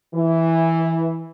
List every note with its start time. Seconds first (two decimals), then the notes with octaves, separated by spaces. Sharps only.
0.14 E3